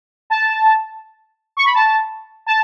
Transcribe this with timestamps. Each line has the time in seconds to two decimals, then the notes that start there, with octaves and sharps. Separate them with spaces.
0.30 A5
1.57 C#6
1.65 B5
1.74 A5
2.46 A5